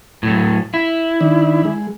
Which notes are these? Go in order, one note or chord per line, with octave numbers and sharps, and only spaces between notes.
A2 F#3
E4
D#3 D4
G#3